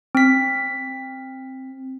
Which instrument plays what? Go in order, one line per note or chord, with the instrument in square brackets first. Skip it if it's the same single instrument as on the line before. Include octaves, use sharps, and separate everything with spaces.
[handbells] C4 B6